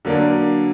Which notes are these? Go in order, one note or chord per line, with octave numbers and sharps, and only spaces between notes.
D3 F#3 A#3 D4